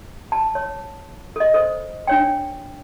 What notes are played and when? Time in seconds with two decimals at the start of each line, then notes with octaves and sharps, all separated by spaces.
0.32 A5
0.55 C#5
1.36 A4 D#5
1.54 A4 C5
2.07 D4 C#5 G5